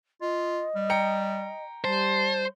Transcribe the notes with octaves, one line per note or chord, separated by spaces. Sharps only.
F4 D#5
G3
G5 A#5 C#7
G3 C5 A5